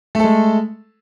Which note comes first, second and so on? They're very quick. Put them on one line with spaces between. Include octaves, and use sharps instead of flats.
A3 A4 G#3